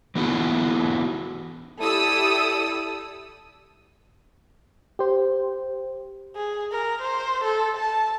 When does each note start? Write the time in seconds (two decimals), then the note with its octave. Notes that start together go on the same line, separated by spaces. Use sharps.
0.15 E3 B3 D#4 E4 F#4
1.79 E4 G4 A4 D5 D#6 E6
4.99 G4 C5
6.36 G#4
6.72 A#4
7.02 C5
7.44 A4
7.77 A5